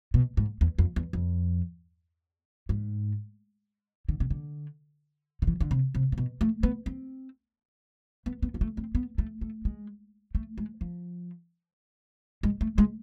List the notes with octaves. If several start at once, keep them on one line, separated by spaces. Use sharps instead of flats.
B2
G#2
E2
F2
E2
F2
G#2
D3
C3
D3
D3
E3
D3
C3
C3
C3
B2
A3
B3
C4
B3
B3
B3
A3
C4
B3
A3
A3
G#3
A3
G#3
F3
G#3
A3
G#3